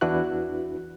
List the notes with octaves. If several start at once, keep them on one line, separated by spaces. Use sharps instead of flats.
E2 D4 E4 F#4 B4 F#6